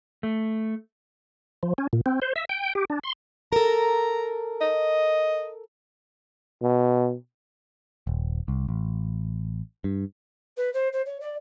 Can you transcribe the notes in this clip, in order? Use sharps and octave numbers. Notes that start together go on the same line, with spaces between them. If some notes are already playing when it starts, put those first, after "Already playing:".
A3
F3
C#4
A#2
C4
C5
E5
G5
G4
D4
C6
A4 A#4 A#5
D#5
B2
D#1
C2
A1
G2
B4
C5
C5
C#5
D5